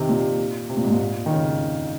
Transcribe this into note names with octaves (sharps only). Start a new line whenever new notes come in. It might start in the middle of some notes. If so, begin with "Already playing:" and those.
Already playing: C3 D#3
A#2
C3
A#2
G#2
A#2
D#3
C#3